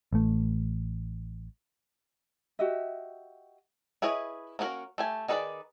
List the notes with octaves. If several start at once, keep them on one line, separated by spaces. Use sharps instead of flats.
A1 A3
F#4 G4 D#5 E5
E4 G#4 B4 C#5 D#5
A#3 C#4 D4 F#4 A#4
A3 G4 G#5
D#3 D#4 G#4 B4 D5